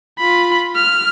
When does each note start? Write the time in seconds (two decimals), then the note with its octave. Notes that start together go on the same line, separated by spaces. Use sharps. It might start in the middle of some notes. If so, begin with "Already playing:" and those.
0.19 F4 B5
0.76 F6